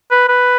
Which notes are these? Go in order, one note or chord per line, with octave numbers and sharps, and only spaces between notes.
B4
B4